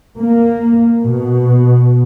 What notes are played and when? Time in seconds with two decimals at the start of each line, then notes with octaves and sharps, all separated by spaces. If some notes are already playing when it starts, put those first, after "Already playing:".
0.18 A#3
1.04 B2